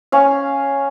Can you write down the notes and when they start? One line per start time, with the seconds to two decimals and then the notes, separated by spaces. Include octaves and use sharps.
0.12 C#4 F5